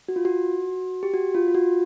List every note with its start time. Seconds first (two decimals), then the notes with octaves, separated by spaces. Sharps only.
0.09 F#4
0.16 F4
0.25 F#4
1.03 G4
1.14 F#4
1.35 F4
1.48 F4
1.55 F#4